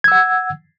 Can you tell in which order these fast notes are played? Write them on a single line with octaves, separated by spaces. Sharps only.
G#6 E6 F#5